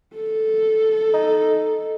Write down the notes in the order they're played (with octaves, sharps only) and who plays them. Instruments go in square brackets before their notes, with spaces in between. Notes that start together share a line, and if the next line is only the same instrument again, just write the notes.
[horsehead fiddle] A4
[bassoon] D#4